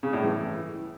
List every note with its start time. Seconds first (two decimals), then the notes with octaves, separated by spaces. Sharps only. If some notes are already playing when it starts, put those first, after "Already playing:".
0.03 C#3
0.13 A2
0.23 E3